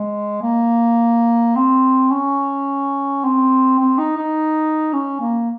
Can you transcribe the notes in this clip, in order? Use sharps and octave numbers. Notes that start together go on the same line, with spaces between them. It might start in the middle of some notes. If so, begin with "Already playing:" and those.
Already playing: G#3
A#3
C4
C#4
C4
C4
D#4
D#4
C#4
A#3